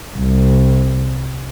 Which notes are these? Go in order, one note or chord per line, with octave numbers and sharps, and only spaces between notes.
C2